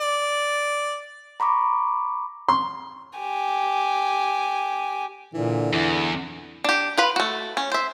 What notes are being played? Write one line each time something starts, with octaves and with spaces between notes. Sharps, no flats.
D5
A#5 B5 C#6 D6
C6
G4 G#5
A#2 D3 E3
E2 E4
D4 G4
F4 B4 B5
A3 F#4
C#4
C5 E5